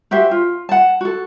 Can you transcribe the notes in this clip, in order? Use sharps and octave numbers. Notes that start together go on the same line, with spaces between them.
F#4 G4 C5 E5
F4
F#5 A5
F#4 A4